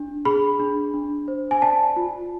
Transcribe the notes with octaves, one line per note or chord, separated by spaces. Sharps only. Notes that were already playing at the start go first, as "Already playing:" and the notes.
Already playing: D4
G#4 B5
D4
D4
C5
G#5
D5 A5
F4